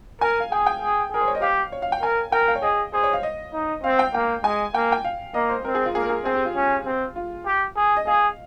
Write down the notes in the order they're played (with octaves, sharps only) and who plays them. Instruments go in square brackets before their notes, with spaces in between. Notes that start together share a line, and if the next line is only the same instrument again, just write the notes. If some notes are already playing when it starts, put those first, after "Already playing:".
[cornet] A#4 [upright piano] G#5
[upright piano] F5
[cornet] G#4 [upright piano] G5
[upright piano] G5
[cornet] G#4
[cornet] G#4 [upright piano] A#4
[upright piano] C5
C#5
D#5
[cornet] G4 [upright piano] F5
[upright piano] C#5
F5
G5
[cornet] A#4 [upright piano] G#5
[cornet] A#4 [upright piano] G5
[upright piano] F5
C#5
[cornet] G#4 [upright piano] D#5
[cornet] G#4 [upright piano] C5
[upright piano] C#5
F5
D#5
[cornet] D#4
[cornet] C4 [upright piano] F5
[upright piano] G5
[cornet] A#3 [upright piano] G5
[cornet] G#3 [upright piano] G#5
[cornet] A#3 [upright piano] G5
[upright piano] G5
F5
[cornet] A#3 [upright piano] D#5
[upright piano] C5
[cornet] C4 [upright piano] A#4
[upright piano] G#4
F4
[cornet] A#3 [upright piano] G#4
[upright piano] A#4
G#4
[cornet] C4 [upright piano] G#4
[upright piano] G4
F4
[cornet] C#4
C4
[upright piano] F4
[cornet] G4
G#4
[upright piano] D#5
[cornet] G#4 [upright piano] F5